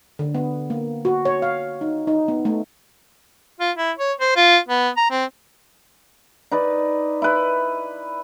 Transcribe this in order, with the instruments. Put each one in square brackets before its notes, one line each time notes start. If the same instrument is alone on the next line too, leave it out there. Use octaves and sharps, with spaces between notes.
[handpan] D3
B3
A#3
F#4
C#5
F5
D#4
D#4
B3
A3
[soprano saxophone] F4
E4
C#5
C5
F4
B3
A#5
C4
[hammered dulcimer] D#4 B4 D5
E4 B4